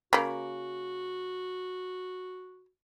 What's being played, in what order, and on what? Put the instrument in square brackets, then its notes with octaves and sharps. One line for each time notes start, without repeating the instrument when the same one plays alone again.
[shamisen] C#3 A#3 [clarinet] F#4